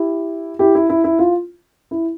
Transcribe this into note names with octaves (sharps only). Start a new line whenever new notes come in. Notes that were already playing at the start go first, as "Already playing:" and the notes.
Already playing: E4 G4
E4 G4
E4
E4
E4
F4
E4